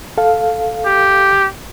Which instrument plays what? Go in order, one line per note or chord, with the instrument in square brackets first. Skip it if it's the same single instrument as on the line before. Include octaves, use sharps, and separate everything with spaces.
[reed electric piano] A4 F5
[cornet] G4